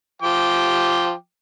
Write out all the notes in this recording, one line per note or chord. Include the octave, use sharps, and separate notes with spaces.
F3 G5 D6